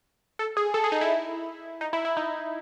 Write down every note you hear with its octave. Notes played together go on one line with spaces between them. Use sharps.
A4
G#4
A4
G#4
D#4
E4
D#4
E4
E4
D#4